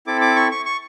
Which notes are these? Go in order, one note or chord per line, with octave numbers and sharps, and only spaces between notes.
C4 E4 A4 D6
D6
C#6
C#6
C#6